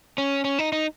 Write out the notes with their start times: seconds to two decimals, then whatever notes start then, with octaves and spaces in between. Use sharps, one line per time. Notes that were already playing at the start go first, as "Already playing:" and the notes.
0.18 C#4
0.44 C#4
0.59 D#4
0.72 D#4